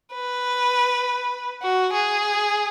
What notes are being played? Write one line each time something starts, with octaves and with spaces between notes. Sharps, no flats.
B4
F#4
G#4